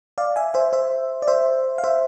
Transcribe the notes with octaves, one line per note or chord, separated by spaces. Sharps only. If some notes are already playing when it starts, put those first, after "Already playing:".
D5 F5
E5 G#5
C5 E5
C5 E5
D5
C5 E5
F5
C5 E5